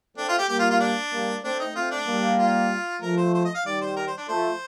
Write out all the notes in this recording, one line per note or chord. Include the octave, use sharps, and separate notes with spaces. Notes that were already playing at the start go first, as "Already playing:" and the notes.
A3 C4 D4
F4
G4
G3 A#3 G4
F4
F4
D4
G3 A#3
A3 C4 D4
D#4
A3 C4 F4
D4
G3 A#3
F4
F3 A3 A#4
C5
C5
D#5
F5
D#3 G3 D5
C5
A#4
C5
D4
F3 A3 C5